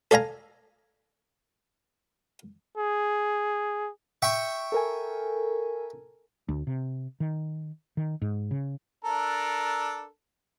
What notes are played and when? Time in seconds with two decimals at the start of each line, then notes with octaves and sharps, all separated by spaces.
0.11 A4 D5 F5 G#5 A#5
2.78 G#4
4.22 E5 G5 C#6
4.72 A4 A#4 G#5
6.49 D2
6.67 C3
7.20 D#3
7.97 D#3
8.22 G#2
8.51 C#3
9.05 D4 A4 A#4